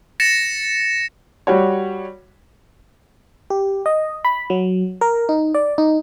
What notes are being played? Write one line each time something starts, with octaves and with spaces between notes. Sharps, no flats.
A6 A#6 C#7 E7
G3 F#4 C#5
G4
D#5
B5
F#3
A#4
D#4
D5
D#4